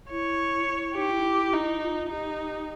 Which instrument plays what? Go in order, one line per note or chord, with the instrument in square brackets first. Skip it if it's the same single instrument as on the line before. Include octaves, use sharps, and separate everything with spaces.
[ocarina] E4 [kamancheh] C#5
[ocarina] E4
[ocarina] D#4 [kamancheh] G4
[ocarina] E4
[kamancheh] D#4
[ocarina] F4
[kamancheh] D#4 [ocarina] G4